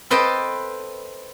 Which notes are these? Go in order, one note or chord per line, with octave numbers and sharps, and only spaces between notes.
A4 B4 C5 D#5 G5 A5